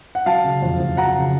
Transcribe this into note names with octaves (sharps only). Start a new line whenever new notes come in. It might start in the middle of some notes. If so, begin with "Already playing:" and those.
F#5
F#3 F5 A5
C#3
F2
F2
F#3 F#5 A#5
C#3